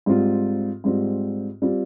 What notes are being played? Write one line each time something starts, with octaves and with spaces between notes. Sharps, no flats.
G#2 G3 C4 F4
G#2 G3 C4 F4
G3 C4 F4